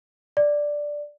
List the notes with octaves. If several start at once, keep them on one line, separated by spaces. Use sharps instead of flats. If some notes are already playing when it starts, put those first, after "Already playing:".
D5